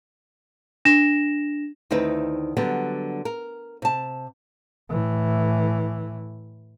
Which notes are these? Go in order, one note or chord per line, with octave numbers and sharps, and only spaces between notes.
D4 A#6 E7
D2 D#3 C4 D#4 E4 B4
D3 F#3 G3 B3
A#4
C3 A5
A2 E3